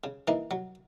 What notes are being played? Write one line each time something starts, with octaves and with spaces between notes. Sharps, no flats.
C#3
E3 A#3 D#4
F#3